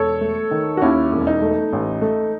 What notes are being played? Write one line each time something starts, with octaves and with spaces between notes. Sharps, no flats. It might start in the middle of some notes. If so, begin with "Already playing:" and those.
Already playing: E1 A4 C#5
A3
D#3
F#4
D#2 C#4 E4
E1
D#4
A3
A1
A3